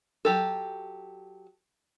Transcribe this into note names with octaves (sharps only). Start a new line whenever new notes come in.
F#3 G4 A4